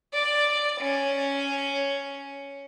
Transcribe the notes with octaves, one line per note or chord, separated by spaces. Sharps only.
D5
C#4